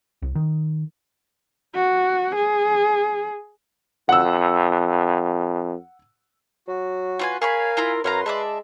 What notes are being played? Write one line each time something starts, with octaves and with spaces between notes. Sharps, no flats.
C2
D#3
F#4
G#4
F2 F#5 E6
F#3 F#4
F4 B4 G#5
G#4 A#4 C#5 F5 G#5 B5
E4 F4 A#5
F#2 B4 C#5 F5 A#5 C6
G#3 D5 E5 A5